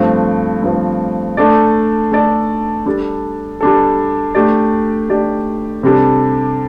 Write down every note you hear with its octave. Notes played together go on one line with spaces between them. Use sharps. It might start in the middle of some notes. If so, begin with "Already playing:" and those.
Already playing: G2 F3 A3 C4
G2 F3 A3 C4
A3 D4 A4 D5
A3 D4 A4 D5
G3 D4 A4
G3 D4 A4
A3 D4 G4 D5
A3 D4 G4 D5
C3 G3 D4 A4